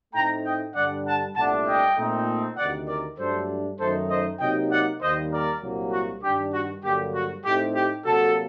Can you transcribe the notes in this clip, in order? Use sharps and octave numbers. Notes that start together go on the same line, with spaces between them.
A2 A3 C4 D#4 G5 A#5
D#5 G5
G2 D3 G3 D4 D5 F#5
F#5 A5
C2 A#2 A3 D4 F#5 A5
D#5 G5
A#2 A3 C4 D#4
D2 C3 D#3 D5 F#5
A#4 D5
G2 F#3 A3 D4 A4 C5
F#2 D#3 F#3 A3 D#4 A4 C5
C5 D#5
C3 F#3 A#3 D#4 D#5 G5
D5 F#5
D#2 D#3 G3 A#3 C5 D#5
A#4 D5
C2 A#2 F#3 A#3
F#4
G2 D#3 G3 D4 G4
F#4
G2 D3 F#3 A#3 G4
F#4
A2 A3 C4 D#4 G4
G4
C3 F#3 A#3 F#4 A4